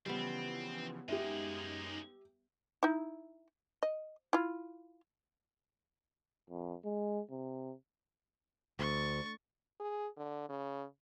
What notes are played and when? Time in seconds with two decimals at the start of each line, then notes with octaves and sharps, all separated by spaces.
0.06 C#3 E3 F3 G3 B3 C4
1.08 F#2 G#3 A#3 D#4 G4 G#4 E5
2.83 D#4 E4
3.83 D#5
4.33 E4 F4
6.50 F2
6.85 G#3
7.31 C3
8.79 D2 C#6 A6
9.80 G#4
10.17 D3
10.49 C#3